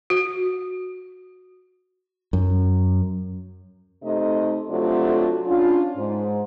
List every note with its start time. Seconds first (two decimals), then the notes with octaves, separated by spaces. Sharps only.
0.10 F#4
2.33 F#2
4.03 C3 A3 D#4 D#5
4.69 C3 F#3 A3 D4 F4
5.47 C#4 D4 F4
5.96 G#2